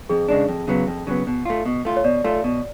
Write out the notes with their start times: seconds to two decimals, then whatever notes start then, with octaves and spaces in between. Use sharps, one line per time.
0.10 F2 G#4
0.28 C#3 G#3 D4
0.49 F2
0.67 C#3 F#3 B3
0.87 F2
1.07 C#3 F#3 B3
1.27 B2
1.46 A3 F4
1.66 B2
1.85 A3 F4
1.97 C#5
2.04 B2 D5
2.24 A3 F4
2.44 B2